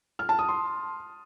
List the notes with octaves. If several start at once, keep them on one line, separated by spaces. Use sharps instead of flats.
F6
A5
D#6
C6